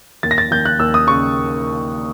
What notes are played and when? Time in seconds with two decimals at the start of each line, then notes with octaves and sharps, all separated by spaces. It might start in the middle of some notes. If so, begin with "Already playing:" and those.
0.23 D#2 A6
0.31 A#6
0.38 A6
0.51 D#2 G6
0.65 F#6
0.79 D#2 E6
0.94 D#6
1.08 C#3 C#6